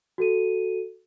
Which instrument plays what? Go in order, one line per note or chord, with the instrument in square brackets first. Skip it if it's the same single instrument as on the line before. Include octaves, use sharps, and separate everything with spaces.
[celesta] F#4 A4 D#7